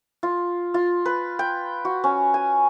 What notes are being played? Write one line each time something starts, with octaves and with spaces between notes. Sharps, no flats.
F4
F4
B4
G5
F#4
C#4
G#5